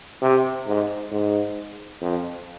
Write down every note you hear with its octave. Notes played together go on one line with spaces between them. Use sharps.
C3
G#2
G#2
F2